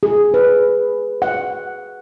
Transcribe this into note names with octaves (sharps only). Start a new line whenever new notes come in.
G#4
B4
F#5